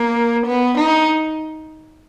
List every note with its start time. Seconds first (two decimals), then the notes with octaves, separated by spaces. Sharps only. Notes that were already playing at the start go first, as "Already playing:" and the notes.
Already playing: A#3
0.45 B3
0.77 D#4